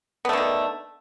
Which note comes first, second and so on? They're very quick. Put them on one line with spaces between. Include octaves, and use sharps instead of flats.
B3 A3 D3 D#3